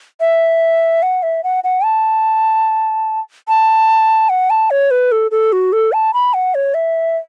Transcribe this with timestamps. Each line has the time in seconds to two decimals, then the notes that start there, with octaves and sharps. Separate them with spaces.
0.20 E5
1.02 F#5
1.23 E5
1.43 F#5
1.64 F#5
1.84 A5
3.48 A5
4.29 F#5
4.50 A5
4.70 C#5
4.91 B4
5.12 A4
5.31 A4
5.52 F#4
5.72 A4
5.92 A5
6.13 B5
6.34 F#5
6.55 C#5
6.74 E5